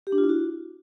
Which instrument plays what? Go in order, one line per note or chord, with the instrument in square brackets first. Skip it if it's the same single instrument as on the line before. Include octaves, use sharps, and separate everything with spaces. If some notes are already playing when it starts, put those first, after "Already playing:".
[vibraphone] G4
D4
F4
E4
F#4